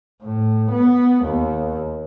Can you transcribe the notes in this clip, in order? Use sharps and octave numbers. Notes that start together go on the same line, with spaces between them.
A2
B3
D#2